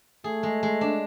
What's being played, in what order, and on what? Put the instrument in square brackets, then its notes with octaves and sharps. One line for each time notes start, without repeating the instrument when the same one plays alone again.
[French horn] A3 [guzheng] G#4
[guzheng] G#3
G#3
D4